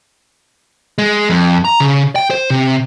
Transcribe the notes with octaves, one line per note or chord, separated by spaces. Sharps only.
G#3
F2
A#5
C#3
G5
C5
C3